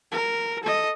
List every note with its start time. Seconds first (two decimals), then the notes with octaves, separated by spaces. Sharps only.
0.12 A#4
0.63 A4 D#5